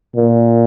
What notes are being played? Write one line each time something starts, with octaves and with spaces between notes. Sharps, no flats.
A#2